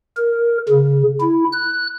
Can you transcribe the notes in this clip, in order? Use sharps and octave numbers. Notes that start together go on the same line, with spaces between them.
A#4
C#3
E4
F#6